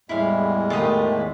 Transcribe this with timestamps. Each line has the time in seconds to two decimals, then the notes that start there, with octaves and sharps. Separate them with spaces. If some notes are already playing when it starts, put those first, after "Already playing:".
0.09 E2 A2 G3 G#3 E4 F5
0.70 D#3 A3 F4 G4 B4 D#5 D#6